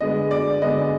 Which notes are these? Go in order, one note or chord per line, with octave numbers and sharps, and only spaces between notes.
D3 G#3 B3 D#5
D5
D3 G#3 B3 D#5